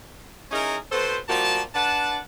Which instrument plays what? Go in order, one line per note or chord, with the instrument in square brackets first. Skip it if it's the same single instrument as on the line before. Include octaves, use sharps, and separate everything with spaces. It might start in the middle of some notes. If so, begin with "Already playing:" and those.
[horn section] C#4 D#4 E4 G#4 A#4
B2 A4 B4 C5
F3 G3 A#3 F#4 A5
D4 B4 F#5 A5